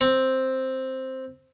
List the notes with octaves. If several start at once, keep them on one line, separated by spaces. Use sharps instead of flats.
C4